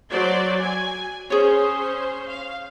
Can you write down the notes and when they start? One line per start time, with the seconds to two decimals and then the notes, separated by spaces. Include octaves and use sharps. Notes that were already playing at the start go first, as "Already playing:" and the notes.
0.11 F#3 C5 D5
0.61 G#5
1.30 C#4 G#4 C5 C#5
2.29 F5